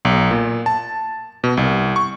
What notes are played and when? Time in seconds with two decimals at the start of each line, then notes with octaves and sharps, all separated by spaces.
0.05 B1
0.31 A#2
0.66 A5
1.44 B2
1.57 C2
1.96 C#6